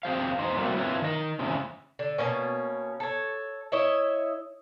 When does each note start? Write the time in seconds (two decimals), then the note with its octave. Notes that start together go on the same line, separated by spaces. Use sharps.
0.03 C4 G#4 C5 F5
0.39 E2 D#4 C5
0.57 F#3 G3 A3 A#3 C4
0.76 C4 E4 F4 B4 C#5
1.02 D#3 D#5
1.39 C#3 E3 G#3 C4
1.99 D3
2.18 B2 A#3 C#4
3.00 A4 C#5
3.72 E4 C#5 D#5 E5